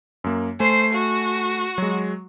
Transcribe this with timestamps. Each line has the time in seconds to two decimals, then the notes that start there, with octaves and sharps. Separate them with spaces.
0.24 F#2 A#3
0.60 A3 C5 G#5 C7
0.94 F#4
1.78 F#3 G#3